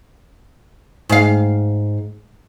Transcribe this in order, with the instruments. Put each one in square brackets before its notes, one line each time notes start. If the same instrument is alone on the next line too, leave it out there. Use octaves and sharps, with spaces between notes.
[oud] G#2 F5